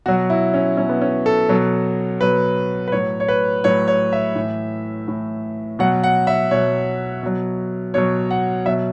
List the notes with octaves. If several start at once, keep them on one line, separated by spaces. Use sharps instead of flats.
B2 F#3 F#4
E4
C#4
B2 F#3 C#4
B3
C#4
A4
B2 F#3
B2 F#3 B4
B4
A2 F#3 C#5
C#5
B4
A2 F#3 C#5
C#5
E5
A2 E3
A2 E3
B2 F#3 F#5
F#5
E5
B2 F#3 C#5
B2 F#3
B2 F#3 C#5
F#5
B2 F#3 E5